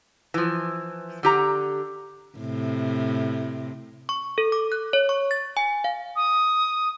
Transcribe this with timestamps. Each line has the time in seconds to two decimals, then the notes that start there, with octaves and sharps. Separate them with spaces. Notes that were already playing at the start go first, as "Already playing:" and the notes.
0.34 E3 F3
1.23 D3 G4 A#5
2.37 A2 C3
4.09 C#6
4.38 A4
4.52 D6
4.72 F#6
4.93 C#5
5.09 C#6
5.31 A6
5.57 G#5
5.84 F5
6.16 D#6